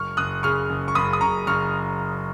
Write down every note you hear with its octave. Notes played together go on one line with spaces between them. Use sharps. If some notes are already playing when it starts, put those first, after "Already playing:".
Already playing: F#1 C#6 F6
F#1 D#6 F#6
C#3 C#6 F6
F#1
C#6
F#1 B5 D#6
D#6
F#1 A#5 C#6
F#1 C#6 F6